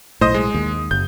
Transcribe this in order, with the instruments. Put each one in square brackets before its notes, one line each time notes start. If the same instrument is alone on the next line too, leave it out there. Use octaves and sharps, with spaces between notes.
[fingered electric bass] B1 A2 [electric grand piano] C5 D#5 D#6
[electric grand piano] G#3
[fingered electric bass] D#2
[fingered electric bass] F#1 [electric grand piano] G6